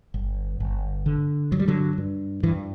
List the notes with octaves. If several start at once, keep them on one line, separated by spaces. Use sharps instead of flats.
G1
G1
D3
G2 F#3
G3
D3 F#3
G2
G2 E3